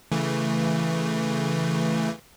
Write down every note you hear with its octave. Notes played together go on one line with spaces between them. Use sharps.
C#3 E3 A3